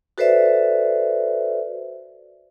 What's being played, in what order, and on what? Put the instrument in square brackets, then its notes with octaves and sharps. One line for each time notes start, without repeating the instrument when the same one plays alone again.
[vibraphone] F#4 A4 B4 C5 D5 E5